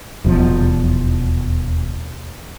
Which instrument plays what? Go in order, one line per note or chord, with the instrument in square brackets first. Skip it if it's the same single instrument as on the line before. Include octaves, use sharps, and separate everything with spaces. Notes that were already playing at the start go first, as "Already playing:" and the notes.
[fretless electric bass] D#1 E2 B2 F3